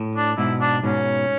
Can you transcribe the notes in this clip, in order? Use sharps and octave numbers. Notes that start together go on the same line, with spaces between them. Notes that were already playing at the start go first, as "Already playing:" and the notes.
Already playing: A2
D4
G#2 B2 E4
D4
G#2 B2 C#4